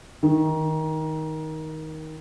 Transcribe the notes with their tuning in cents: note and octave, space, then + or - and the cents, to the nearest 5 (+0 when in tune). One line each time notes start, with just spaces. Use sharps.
D#3 +15